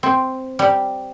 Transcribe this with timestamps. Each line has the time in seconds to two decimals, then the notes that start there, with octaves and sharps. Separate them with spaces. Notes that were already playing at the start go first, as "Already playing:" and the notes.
0.03 C4
0.59 G3